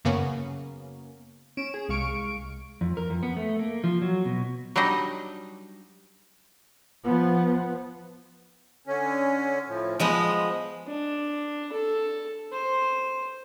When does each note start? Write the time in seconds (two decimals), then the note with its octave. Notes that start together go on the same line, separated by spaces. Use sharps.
0.05 F#2 C#3 A#3 B3 C#4
1.57 C#4 D7 E7
1.74 G#4
1.89 C2 G#3 F5 C#6 D7
2.81 F2
2.97 A#4
3.10 F2
3.23 B3
3.37 A3
3.59 A#3
3.84 F3
4.02 F#3
4.25 B2
4.76 F#3 G3 D4 D#4 D#5
7.04 F3 B3
8.87 D3 C#4
9.68 A2 F3
10.00 F3 G#3 B3 D#6
10.87 D4
11.72 A4
12.53 C5